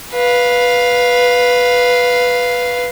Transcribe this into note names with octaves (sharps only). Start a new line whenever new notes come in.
B4 F5